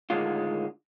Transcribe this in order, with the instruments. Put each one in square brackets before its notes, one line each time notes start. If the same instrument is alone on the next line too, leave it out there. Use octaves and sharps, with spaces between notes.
[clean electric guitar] A2 D3 D#3 G#3 F4